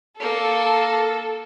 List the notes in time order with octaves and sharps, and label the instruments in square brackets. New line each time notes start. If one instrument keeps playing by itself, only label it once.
[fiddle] A#3 [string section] A4